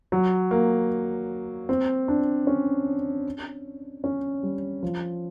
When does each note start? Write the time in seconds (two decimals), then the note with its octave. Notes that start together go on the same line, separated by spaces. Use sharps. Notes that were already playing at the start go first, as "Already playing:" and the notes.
0.12 F#3
0.51 A#3
1.69 C4
2.08 D4
2.47 C#4
4.04 C#4
4.43 G3
4.83 F3